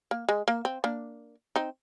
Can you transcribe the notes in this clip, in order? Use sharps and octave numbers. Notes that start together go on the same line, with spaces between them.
A#3
G#3
A#3
C4
A#3 D4
C4 D#4